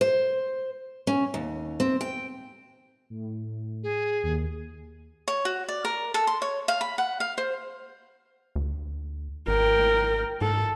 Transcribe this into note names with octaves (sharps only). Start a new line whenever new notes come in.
C5
C#4
D#2
C4
G5
A2
G#4
D#2
C#5
F#4
D5
A#4
A4
C6
C#5
F5
B5
F#5
F5
C5
D2
G#1 A#4 G5
G#2 A4